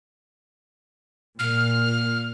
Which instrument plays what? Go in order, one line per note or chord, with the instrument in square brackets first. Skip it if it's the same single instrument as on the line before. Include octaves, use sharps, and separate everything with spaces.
[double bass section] A#2 [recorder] F6